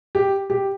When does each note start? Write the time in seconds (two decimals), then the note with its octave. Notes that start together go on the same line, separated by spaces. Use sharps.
0.15 G4
0.50 G4